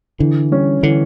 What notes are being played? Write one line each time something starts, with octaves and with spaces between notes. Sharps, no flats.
D3 E3
G3 C#4
D3 E3